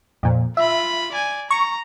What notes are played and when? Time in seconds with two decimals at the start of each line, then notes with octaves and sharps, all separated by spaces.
0.23 F2 A#2
0.57 F4 E5 B5
1.12 D5 G#5
1.51 A#5 C#6